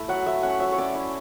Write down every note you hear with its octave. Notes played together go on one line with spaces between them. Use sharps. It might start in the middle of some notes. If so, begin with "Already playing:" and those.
Already playing: A3 E4
F#3 F#5
A3 E5
C#4 F#5
F#3 E5
C#5
C#4 D5
E4